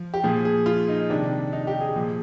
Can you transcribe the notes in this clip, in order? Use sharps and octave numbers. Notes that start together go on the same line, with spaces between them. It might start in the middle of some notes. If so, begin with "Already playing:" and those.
Already playing: F3
G4
A#2 F3 G#4
G#4
F4
D#4
C3 D#3 D4
D#4
G4
G#4
A#2 F3